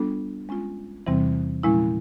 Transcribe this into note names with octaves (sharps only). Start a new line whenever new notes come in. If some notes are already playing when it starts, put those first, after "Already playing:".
Already playing: G3 B3 D4 F4 A4
G#3 C#4 F4
E2 C3 E3 G3 C4
A#2 F3 G#3 C#4 E4